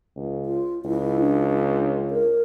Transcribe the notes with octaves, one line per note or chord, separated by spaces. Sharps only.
C#2
F4
C#2 E4
D4
A#4